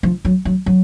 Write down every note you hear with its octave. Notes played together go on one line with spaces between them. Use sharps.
F3
F#3
F#3
F#3